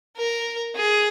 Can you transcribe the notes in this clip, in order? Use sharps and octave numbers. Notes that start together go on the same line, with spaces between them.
A#4
G#4